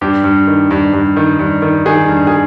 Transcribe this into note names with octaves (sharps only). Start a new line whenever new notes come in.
G2 G4
G2
D#3
G2
G2
D#3
G2
D#3
D#3 G#4
G2
G#4